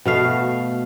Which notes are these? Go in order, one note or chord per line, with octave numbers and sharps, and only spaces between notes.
B2 A3 F5